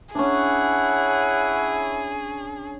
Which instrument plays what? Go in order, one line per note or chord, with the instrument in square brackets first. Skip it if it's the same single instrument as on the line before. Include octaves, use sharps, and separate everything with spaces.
[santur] C#4 D4 [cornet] E4 [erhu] G#4 [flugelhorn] F#5